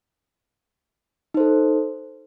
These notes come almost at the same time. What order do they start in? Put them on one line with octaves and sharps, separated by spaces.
D#4 C5 A4